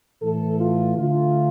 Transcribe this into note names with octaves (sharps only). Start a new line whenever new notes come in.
A2 E3 A3 A4
F4
D3 A3 F4